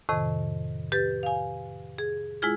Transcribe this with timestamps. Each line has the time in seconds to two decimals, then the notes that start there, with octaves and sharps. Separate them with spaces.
0.09 F2 A2 C3 D#3
0.92 G4 B4 A6
1.23 F5 G#5
1.98 G#4
2.42 G#3 E4 F4 G#4